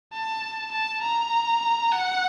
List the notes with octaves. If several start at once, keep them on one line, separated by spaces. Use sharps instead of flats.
A5
A5
A#5
F#5